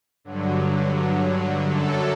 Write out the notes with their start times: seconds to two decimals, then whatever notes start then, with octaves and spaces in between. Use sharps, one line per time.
0.24 G2 D3 F#3
1.67 F#2 D3 F#3 A4